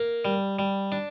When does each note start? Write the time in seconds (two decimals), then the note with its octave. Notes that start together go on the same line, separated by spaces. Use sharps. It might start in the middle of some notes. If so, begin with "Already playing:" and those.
Already playing: A#3
0.25 G3
0.59 G3
0.92 D4